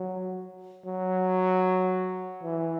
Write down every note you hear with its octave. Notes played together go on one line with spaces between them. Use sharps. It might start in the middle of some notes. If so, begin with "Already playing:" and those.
Already playing: F#3
F#3
E3